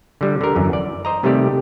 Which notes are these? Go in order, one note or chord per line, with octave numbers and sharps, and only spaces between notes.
D3 G3
D3 A#4
F#2 E3
D5
C5 D#5 A#5
C3 D#3 G3 A3 G4 D5